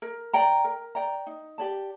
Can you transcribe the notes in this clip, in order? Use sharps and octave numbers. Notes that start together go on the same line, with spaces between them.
A#4
D5 G5 A#5
A#4
D5 G5 A#5
D#4
G4 D5 A5